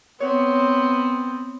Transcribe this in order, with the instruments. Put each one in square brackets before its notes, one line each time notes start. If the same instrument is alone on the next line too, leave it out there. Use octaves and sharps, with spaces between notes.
[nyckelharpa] B3 C4 [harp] C#5